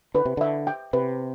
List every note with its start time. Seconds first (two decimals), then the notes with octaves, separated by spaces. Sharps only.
0.14 D3 B4
0.25 C3
0.37 D3 E5
0.67 G5
0.93 C3 B4